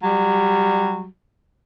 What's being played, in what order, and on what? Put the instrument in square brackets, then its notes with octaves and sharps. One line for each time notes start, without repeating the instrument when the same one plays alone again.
[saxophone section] F#3 G3